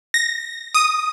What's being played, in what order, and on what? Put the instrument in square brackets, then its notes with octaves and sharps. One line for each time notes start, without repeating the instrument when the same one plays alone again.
[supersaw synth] A#6
D#6